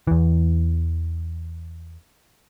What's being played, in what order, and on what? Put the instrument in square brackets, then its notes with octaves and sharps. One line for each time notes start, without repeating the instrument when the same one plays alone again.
[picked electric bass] E2 E3